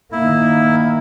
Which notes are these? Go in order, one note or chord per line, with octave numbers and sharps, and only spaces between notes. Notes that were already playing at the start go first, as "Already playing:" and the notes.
D#3 A#3 E4